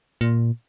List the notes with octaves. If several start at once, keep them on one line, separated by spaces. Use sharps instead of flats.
A#2